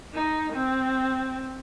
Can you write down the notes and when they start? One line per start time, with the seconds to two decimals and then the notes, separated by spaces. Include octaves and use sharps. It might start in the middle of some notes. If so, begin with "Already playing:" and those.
0.13 D#4
0.53 C4